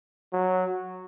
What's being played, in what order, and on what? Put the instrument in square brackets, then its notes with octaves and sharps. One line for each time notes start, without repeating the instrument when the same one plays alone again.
[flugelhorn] F#3